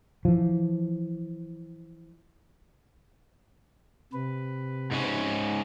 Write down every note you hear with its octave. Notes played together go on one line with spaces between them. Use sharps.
E3 F3
C3 B4
G#2 C#4